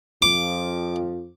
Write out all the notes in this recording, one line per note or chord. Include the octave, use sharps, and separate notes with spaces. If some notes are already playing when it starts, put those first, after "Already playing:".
F2 F3 D6